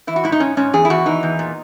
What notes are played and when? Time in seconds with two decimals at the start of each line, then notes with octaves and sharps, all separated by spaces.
0.07 E3 E4
0.16 F#4
0.24 G#2 E4
0.32 D#4
0.40 G#2 C#4
0.57 G#2 C#4
0.73 E2 G#4
0.85 E4
0.90 E2 F#4
1.06 E3 D#4
1.23 E2
1.39 A#2